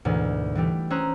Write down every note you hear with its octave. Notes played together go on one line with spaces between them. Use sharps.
D2 G#2 B2 D3 E3
E3 G3 A3 G4
C#4 C5 A#5 D#6 E6 F#6